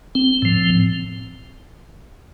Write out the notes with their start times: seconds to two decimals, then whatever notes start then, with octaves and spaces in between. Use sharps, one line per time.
0.15 C4
0.42 A2 F3